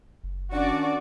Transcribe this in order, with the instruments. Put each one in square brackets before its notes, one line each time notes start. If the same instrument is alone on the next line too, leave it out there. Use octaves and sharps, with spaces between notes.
[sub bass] F#1
[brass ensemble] D#3 D4 [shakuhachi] C#4 [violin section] F#4 D5